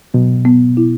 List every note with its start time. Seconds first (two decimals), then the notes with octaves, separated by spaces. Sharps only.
0.14 B2 F#3
0.45 B3
0.77 E4